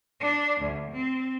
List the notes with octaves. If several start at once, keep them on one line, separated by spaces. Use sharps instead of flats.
D4
D2
C4